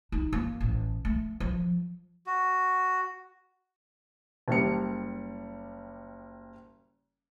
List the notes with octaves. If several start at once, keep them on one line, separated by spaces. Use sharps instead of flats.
D#4
A#3
A1
A3
F3
F#4
F#1 G3 C#7